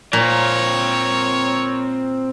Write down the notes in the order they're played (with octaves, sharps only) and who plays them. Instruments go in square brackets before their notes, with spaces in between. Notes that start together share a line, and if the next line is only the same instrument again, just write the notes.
[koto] A#2 [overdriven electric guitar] C4 A#4 [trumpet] C#5